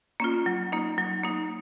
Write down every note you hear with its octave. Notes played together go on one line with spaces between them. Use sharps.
A#3 C#4 F4
F#3
A#3 D#4
F#3
A#3 D#4